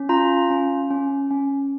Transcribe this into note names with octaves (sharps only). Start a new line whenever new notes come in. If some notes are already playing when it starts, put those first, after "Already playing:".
Already playing: C#4
F4 A#5
C#4
C#4
C#4